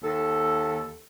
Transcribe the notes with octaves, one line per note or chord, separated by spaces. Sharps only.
D#2 A4